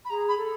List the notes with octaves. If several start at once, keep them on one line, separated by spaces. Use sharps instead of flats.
B5
G#4 A#5
B5
A4